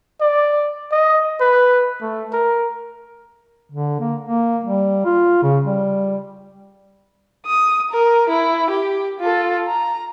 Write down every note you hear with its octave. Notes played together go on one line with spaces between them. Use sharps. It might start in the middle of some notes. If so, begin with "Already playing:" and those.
D5
D#5
B4
A3
A#4
D3
A#3
A#3
G3
F4
C#3
G3
D#6
A#4
E4
G4
F4 A4
A#5